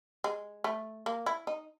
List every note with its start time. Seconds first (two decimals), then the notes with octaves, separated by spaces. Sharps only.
0.24 G#3
0.64 A3
1.06 A#3
1.26 E4
1.47 D#4